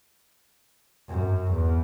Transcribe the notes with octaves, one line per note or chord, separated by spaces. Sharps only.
F#2
E2